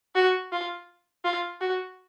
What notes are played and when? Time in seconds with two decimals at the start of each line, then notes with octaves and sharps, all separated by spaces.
0.15 F#4
0.52 F4
1.25 F4
1.61 F#4